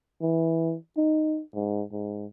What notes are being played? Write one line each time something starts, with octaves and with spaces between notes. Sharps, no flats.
E3
D#4
G#2
G#2